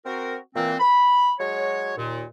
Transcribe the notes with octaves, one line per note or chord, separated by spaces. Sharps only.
C4 F#4 A#4
A#2 E3 C4
B5
F#3 G#3 F#4 C#5
D#2 A#2